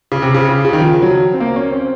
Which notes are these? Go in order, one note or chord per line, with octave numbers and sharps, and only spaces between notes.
C#3
C3
C#3
C#3
C#3
D#3
F3
F#3
C4
A#3
C#4
C4